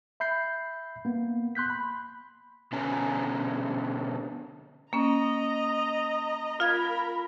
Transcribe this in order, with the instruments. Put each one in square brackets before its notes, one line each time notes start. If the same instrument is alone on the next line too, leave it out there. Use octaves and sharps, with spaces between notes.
[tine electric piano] E5 B5 G6 C7
A#3 B3
C6 F#6 G6 B6
B5
[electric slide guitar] B2 D3 B3 C#4 G#5 A#5
[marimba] A#3 C#4 [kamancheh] D#5 A#5
[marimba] F4 F5 G#6 [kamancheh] A#4 B5